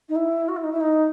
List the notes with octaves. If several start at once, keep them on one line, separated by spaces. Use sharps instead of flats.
D#4
E4
F#4
E4
D#4
E4
D#4